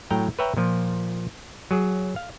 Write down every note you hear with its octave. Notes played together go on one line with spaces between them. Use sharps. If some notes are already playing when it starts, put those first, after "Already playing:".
A2 F#3 G5 A#5
B4 C#5 E5 G5 A#5
A#2 F3
F#3 G#4
F5